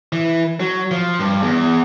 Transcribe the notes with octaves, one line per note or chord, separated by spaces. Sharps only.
E3
F#3
F3
G2
E2